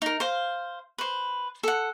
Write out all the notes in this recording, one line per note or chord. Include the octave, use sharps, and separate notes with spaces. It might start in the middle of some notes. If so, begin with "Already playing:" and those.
D#4 A#4
C5 F5
B4 C5
A4 F#5